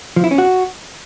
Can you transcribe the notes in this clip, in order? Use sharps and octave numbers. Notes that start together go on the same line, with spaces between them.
F3
E4
C#4
F#4